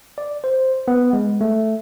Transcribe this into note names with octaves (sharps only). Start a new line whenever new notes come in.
D5
C5
B3
G#3
A3